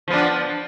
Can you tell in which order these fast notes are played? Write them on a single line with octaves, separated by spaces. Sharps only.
F3 B3 D4